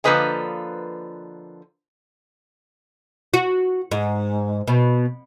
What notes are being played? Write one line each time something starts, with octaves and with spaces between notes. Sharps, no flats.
D3 F3 A#3 B4 D#5 G#5
F#4
G#2
B2